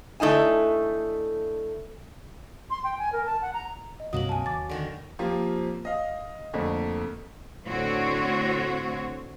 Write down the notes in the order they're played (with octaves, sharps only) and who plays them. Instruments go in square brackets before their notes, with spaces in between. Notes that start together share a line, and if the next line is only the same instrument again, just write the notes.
[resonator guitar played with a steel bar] D3 A3 D#4 E4 G#5
[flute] C6
G5
G#5
A#4
A5
F#5
A#5
[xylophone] D#5
[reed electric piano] C2 G2 C3 [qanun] F#3 A#3 [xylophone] D#6 F#7
[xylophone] G#5 A5
[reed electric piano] D#2 [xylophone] D6 A6
[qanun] D3 D#3 C#5
[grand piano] F3 A#3 C4 F4 G4
D#5 F5
F2 D3 A3 A#3
[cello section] A2 D3 C4 F#4 C#5